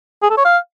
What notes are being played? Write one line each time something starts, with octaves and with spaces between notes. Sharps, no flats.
G#4
A4
C#5
F5